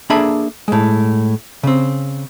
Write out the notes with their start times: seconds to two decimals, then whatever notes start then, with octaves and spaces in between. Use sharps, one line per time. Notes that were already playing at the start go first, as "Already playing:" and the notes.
0.10 A#3 D4 G#4 A4 E5 B5
0.68 A2 G#3
1.63 C#3 C4